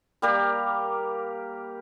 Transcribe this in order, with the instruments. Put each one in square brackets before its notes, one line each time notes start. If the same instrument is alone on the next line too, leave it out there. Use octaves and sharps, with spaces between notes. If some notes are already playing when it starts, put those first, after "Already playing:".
[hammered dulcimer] G3 A#3 G4 A#4